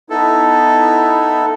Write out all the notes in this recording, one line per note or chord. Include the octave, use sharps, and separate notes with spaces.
B3 D#4 E4 A4